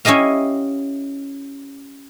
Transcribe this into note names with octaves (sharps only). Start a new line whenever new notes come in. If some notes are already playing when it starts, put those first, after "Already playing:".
C#4 E4 G4 D#5 F5